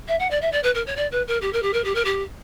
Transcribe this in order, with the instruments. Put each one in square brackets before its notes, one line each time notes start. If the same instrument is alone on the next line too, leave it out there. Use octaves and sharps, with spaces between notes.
[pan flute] E5
F#5
D5
E5
D5
B4
A#4
C#5
D5
B4
A#4
G4
A#4
G4
A#4
G4
A#4
G4